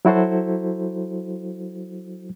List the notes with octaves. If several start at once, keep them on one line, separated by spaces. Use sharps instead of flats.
F#3 E4 F#4 A4 C5